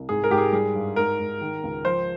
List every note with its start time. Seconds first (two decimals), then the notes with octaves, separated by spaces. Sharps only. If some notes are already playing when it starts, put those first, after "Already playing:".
Already playing: C2
0.09 G#2 G#4
0.24 A#4
0.30 G#2 G4
0.38 G#4
0.52 G3 G#4
0.75 G2
0.96 G#2 A#4
1.20 G#2
1.41 D#3
1.63 C#2
1.85 F3 C5